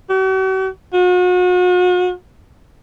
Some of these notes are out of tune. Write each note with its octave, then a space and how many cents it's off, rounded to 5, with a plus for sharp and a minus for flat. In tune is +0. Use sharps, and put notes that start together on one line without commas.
F#4 +45
F#4 -40